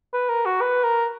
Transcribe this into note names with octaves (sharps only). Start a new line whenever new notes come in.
B4
A#4
F#4
B4
A#4